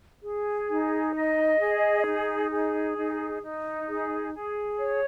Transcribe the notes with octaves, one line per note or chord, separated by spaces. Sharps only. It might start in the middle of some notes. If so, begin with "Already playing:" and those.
G#4
D#4
D#5
G#4
D#4
G#4
D#4
D#4
G#4
G#4
C#5